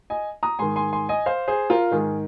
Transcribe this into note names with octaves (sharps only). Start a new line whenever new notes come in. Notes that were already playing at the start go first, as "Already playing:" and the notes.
D#5 G#5
A#5 D#6
G#2 D#3 G#5 C6
G#5 C6
G#5 C6
D#5 G#5
C5 F5
G#4 C5
F4 A#4
G#2 D#3 G#4